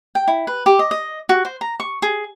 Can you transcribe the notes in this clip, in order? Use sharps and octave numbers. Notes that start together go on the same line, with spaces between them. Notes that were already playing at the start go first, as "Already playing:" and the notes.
G5
E4
B4
G4
D#5
D#5
F#4
C5
A#5
C#6
G#4